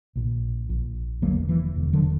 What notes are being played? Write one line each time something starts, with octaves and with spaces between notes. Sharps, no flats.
A#1 A#2
A#1 A#2
E1 E2 D3 F#3 A#3
E3
E1 E2 D3
D3 F#3